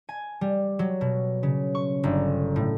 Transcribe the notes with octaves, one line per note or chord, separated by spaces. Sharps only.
G#5
G3
F#3
B2
C#3
C#6
G1
A2